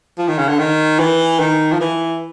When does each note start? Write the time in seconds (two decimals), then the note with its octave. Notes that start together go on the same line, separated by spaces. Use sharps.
0.18 F3
0.28 D#3
0.38 C#3
0.49 D3
0.59 D#3
0.99 E3
1.40 D#3
1.72 F3
1.80 E3